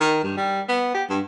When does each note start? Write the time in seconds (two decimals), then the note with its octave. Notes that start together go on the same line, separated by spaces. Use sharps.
0.01 D#3
0.23 G2
0.37 G3
0.68 B3
0.94 G4
1.09 G2